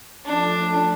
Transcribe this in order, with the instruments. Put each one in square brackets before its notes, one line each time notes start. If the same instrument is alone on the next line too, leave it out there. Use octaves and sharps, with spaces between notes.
[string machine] F3 A3 [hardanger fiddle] D4